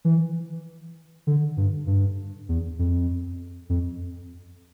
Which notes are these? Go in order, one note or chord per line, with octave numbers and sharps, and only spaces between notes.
E3
D3
G2
G2
E2
F2
F2